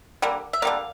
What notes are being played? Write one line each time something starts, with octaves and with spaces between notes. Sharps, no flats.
D3 G3 A#3
E5
D3 G3 A#3 F5